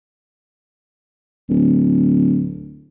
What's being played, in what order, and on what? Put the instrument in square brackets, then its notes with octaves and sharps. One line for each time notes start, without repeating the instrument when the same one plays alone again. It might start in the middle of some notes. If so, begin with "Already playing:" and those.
[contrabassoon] D1